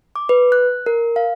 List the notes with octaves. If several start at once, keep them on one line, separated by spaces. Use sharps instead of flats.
D6
B4
F#6
A#4
F5